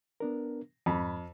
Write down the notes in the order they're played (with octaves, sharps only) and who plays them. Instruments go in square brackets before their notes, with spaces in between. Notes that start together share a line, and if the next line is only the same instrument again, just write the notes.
[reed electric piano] B3 D4 A#4
[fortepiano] F2 [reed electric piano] G#2 B5